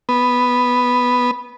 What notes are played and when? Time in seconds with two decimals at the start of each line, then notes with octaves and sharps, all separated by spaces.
0.09 B3